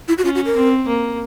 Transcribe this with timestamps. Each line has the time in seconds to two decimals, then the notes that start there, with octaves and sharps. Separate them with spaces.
0.08 E4
0.18 F#4
0.24 C#4 F4
0.35 F#4
0.46 A#4
0.56 C4
0.88 A#3